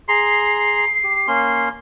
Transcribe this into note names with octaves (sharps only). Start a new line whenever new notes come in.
G#4 A#5 C6 C7
G4
A#3 C#4 C6